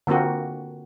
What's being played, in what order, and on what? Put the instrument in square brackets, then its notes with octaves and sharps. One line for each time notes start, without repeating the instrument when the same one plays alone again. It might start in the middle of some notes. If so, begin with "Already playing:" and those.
[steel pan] D3 A#3 C4 F4 F#4